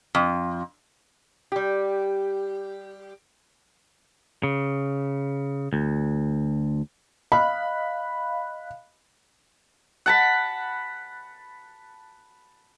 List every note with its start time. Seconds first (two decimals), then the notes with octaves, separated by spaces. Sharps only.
0.15 F2
1.52 G3 G4
4.43 C#3
5.73 D2
7.32 D#5 F5 B5 F#6
10.06 F#5 A5 B5